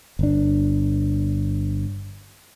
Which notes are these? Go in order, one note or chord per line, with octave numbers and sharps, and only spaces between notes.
G1 D4